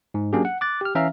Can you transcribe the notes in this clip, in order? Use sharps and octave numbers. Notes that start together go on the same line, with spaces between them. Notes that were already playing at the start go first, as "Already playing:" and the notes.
G#2
F#3 A#3 C#4 D4 G4 G#4
F#5
D6 F#6 A6
G4 F6
E3 C#4 E5 F5 A#5 F6